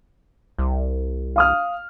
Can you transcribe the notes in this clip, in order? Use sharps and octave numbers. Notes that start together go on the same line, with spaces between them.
C2
F5 D#6 F6